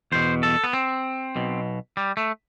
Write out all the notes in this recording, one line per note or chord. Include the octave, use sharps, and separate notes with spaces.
E2 B2 C5
A4
B3
C4
B1 B2
G3
A3